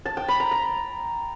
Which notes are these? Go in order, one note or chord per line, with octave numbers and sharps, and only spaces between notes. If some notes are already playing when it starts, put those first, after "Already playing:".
A5
G5
B5
A#5
A#5